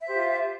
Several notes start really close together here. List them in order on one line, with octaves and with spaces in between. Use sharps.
E5 C5 G4 F4